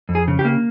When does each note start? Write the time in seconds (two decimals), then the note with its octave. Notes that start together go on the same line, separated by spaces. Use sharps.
0.09 F2
0.15 G#4
0.28 C#3
0.39 G4
0.45 A#3